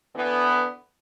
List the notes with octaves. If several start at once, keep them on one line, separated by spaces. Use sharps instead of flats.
D3 E3 B3